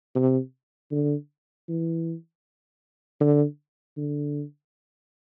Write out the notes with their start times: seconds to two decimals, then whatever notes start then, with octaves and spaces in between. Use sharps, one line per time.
0.15 C3
0.91 D3
1.69 E3
3.20 D3
3.97 D3